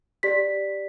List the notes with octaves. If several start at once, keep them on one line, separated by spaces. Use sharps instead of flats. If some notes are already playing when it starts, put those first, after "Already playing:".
G4 D5 B6